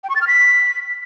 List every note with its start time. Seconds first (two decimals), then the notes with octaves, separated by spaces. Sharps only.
0.04 G5
0.10 C#6
0.16 A6
0.21 F6
0.27 B6